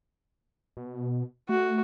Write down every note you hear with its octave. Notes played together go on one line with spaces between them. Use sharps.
B2
A3 F#4